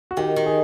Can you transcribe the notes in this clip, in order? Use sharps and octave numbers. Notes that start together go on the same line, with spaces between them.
F#4
D#3 G4
D#3
G#4